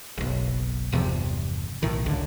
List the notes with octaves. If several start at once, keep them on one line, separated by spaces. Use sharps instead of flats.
F#1 B1
G1 E2 C3 F3
B1 A2 D#3
G#1 C#2 D3